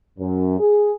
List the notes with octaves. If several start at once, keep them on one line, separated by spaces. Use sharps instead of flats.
F#2
G#4